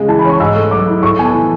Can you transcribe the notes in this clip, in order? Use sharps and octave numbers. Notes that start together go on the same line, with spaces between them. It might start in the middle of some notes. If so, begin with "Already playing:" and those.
Already playing: C#3 G#3
E3 A5
B5
C#4
C#6
G#2 E6
A3
F#3 D6
E4
A2 C#6
B3 G#5
A5
E3